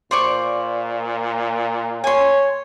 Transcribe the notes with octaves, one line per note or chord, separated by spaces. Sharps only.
A#2 C5 D5 C#6
C#5 G#5 C6